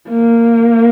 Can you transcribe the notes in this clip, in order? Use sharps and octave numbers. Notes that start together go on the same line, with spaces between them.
A#3